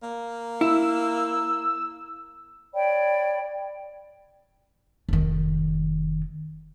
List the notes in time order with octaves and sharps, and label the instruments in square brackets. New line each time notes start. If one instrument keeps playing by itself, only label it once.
[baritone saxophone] A#3
[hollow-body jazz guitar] E4 [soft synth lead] E6
[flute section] C#5 D5 G5 B5
[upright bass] F1 D#3